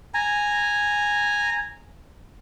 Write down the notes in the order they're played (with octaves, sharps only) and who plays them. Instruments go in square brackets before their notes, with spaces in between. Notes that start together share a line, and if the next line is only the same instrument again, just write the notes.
[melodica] G#5 A#5